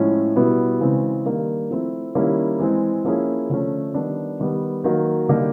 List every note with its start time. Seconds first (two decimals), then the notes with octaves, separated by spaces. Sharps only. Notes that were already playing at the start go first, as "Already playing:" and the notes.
Already playing: A2 F3 G#3 C#4 E4
0.36 B2 G3 B3 E4
0.80 C#3 E3 G#3 C4
1.25 D#3 G3 A#3 D4
1.70 F3 A3 C4 E4
2.15 D#3 G3 A#3 C#4 E4
2.59 E3 G#3 C4
3.04 F3 A#3 C#4 E4 G#4
3.49 D3 F3 A3 C#4
3.94 D#3 G3 B3 D4
4.39 D#3 G3 B3
4.84 D#3 F#3 A#3
5.29 D3 G3 A#3 D#4 G4